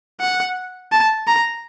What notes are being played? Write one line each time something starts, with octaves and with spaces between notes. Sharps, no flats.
F#5
A5
A#5